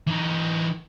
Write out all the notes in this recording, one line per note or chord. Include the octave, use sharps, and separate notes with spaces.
E3 D#4